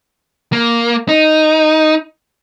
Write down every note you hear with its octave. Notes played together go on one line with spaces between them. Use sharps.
A#3
D#4